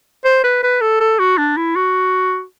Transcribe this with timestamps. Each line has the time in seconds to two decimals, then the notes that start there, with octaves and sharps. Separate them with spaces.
0.25 C5
0.44 B4
0.63 B4
0.81 A4
1.00 A4
1.19 F#4
1.38 D4
1.57 E4
1.76 F#4